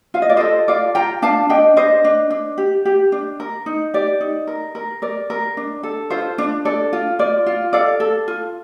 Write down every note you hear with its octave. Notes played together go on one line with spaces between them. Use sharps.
F4 F5
D#5
D5
A4 C5 D#5
F4 D5 F5
F4 G5 A#5
D4 F5 A5
D4 D#5 G5
D4 C5 D#5
D4
D4
G4
G4
D4
A#4
D#4
G4 D5
D#4
A#4
A#4
A#4 D5
A#4
D4
A4
F4 C5
D4
A4 D5
F4
F4 D5
F4
A4 D5 F5
A4
F4